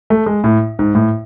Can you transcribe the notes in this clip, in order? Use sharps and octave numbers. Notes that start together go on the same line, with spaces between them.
A3
G#3
A2
G#2
A2